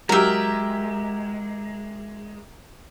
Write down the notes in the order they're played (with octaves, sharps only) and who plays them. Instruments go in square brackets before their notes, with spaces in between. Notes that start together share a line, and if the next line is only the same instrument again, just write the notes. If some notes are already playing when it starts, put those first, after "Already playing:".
[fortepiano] F#3 G4 [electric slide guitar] G#3 [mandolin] A#4 E5